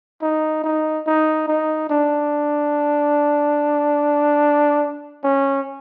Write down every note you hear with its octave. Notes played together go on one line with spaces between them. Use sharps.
D#4
D#4
D#4
D#4
D4
C#4